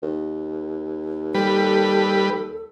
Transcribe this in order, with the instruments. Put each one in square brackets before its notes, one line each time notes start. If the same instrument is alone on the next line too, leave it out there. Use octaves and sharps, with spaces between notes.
[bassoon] D#2
[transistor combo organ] G3 B4 [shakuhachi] A4